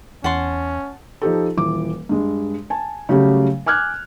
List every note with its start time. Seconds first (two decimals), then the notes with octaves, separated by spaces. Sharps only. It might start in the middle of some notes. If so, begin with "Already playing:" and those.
0.24 E2 C#4 F#5 A5 C6
1.22 F3 D#4 G4 A4
1.57 D#1 E3 D6
2.09 G2 G#3
2.70 G#5 A5
3.09 C#3 F#3 G3 A3 C#4 G4
3.66 G#5 D6 F6 F#6 G#6